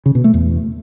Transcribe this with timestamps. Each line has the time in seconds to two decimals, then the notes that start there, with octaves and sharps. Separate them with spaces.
0.06 C#3
0.15 B2
0.24 A3
0.34 E2